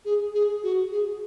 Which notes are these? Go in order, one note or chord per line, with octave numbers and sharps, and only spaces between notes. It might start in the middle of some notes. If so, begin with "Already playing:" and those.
G#4
G#4
F#4
G#4